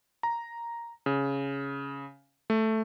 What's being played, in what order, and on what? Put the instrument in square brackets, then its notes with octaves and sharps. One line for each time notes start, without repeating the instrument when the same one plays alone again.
[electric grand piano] A#5
C#3
A3